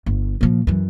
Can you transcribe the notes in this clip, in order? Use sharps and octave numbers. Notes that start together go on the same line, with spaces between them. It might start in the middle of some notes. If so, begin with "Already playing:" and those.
G1
A#2 F3
F#2 E3